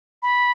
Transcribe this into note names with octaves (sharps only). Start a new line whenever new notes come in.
B5